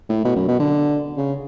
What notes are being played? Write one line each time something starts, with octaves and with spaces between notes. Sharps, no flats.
A2
B2
F#2
B2
D3
C#3